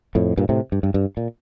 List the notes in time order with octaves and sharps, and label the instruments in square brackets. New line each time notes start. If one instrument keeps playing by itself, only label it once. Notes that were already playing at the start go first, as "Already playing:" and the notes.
[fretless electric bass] F2 A2
G2 A#2
A2 C3
G2
G2
G2
A#2